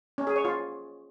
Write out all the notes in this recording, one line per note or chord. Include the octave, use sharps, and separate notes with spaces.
C#4
G#4
C#5
F4